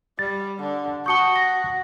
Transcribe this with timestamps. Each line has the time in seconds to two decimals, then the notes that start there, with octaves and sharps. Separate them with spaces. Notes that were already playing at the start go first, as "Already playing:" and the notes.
0.19 G3 A6
0.59 D3
1.06 F#4 A5 C#6 D#6 G6 C#7 G7
1.36 A#6